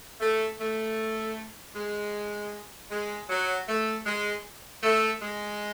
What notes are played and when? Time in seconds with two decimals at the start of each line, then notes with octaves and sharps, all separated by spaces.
0.20 A3
0.60 A3
1.75 G#3
2.91 G#3
3.29 F#3
3.69 A3
4.06 G#3
4.83 A3
5.22 G#3